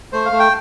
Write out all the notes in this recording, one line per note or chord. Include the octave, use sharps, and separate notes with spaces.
A3 C5
F5
A3
G5